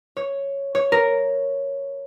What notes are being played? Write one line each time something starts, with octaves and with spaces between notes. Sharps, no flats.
C#5
C#5
A#4